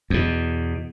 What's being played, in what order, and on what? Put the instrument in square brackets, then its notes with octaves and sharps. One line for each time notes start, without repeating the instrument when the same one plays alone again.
[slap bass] E2 B2